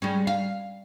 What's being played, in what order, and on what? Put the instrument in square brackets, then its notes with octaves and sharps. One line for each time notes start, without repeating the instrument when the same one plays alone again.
[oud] G3 G#3 C#4
F5